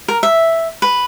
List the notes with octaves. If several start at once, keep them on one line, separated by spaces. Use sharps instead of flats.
A#4
E5
B4